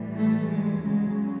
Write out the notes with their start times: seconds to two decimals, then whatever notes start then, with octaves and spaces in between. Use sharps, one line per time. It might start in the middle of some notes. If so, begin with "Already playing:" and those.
Already playing: A2 E3 G3
0.16 A3
0.49 G#3
0.82 E2 C#3 F#3 G#3